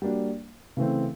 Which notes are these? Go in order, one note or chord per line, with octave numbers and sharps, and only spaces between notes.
G3 A#3 D4 F#4
C#3 E3 A3 C4